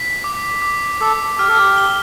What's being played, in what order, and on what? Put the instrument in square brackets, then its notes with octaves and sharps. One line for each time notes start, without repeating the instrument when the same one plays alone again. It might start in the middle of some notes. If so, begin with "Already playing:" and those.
Already playing: [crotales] B6
D6
D6
[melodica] A4 [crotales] D6
[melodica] G4 [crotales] F6
[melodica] A4
G4
[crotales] G7